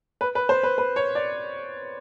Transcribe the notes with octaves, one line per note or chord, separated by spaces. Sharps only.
B4
B4
C5
B4
B4
C#5
D5